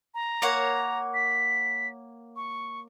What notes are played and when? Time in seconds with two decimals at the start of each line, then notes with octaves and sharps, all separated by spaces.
0.14 A#5
0.42 A#3 C#5 F#5
1.14 B6
2.36 C#6